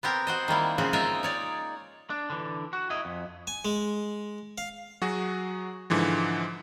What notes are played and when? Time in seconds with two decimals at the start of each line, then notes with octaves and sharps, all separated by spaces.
0.03 B3 C4 G4 A#4
0.27 F#4 C5 D#5
0.48 D#3 G3 A#3 E4
0.78 C#3 F3 C4 F#4 G#4
0.93 G#3 D#4 F4 A#4 D#5 E5
1.23 D#4 C#5 D5
2.10 D4
2.30 D3 E3
2.73 F#4
2.90 E4 D#5
3.05 F2
3.47 G#5
3.65 G#3
4.58 F5
5.02 F#3 F#4 G#4
5.90 G#2 D3 E3 F3